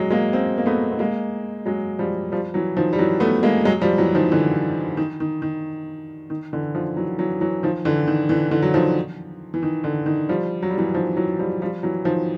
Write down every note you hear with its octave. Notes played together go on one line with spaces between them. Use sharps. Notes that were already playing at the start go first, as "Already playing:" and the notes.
Already playing: F#3 G#3
G#3 A#3
A#3 C4
A#3
A3 B3
B3
G#3 A#3
F#3 G#3
F3 G3
F3 G3
E3 F#3
D#3 F3
G3
E3 F#3
A3 B3
G#3 A#3
F#3 G#3
F3 G3
E3 F#3
D#3 F3
D3 E3
D#3
D#3
D#3
D#3
D3 E3
D#3 F3
E3 F#3
E3 F#3
E3 F#3
D#3 F3
D3 E3
D#3
D3 E3
D3 E3
F#3
D#3 F3
E3
D#3
D3
D#3
F3 G3
F#3
G3
E3 F#3
D#3 F3
E3 F#3
F3 G3
F3 G3
E3 F#3
D#3 F3